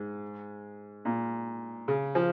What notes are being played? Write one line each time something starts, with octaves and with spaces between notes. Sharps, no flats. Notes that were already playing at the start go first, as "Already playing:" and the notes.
Already playing: G#2
A#2
C#3
F3